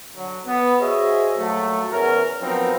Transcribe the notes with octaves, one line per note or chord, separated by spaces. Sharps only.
D3 F#3
B3
F#4 G#4 C5 C#5 D#5 E5
A#2 F#3 G3 A3
E2 C#4 A#4
F3 F#3 B3 C4 D#4 A#4